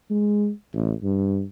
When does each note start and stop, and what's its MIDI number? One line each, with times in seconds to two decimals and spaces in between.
0.10 0.50 56
0.74 0.92 33
1.03 1.44 43